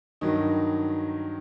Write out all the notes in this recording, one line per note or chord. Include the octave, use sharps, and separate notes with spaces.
G2 D#3 F#3 D#4